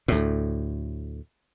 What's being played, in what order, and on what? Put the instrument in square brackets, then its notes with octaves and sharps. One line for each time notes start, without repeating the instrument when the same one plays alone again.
[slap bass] D2 A2